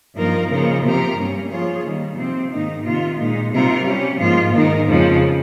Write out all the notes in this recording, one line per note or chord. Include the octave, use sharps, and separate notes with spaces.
G2 F3 A#3 D#4 A#4
C#3 F3 A#3 D#4 A#4
C3 F3 C4 G4 A#4
G2 G3 A#3 C#4
F3 A#3 F4 G#4 C#5
D#3 G3 A#3
C3 F3 C4
G#2 D#3 A#3 D#4
C3 D#3 A#3 F4
A#2 G#3 D#4
C3 G3 C4 F4 A#4
G3 C#4 G4
G#2 F3 A#3 F4
G#2 D#3 A#3 D#4 A#4
F2 C#3 F3 G#3 C#4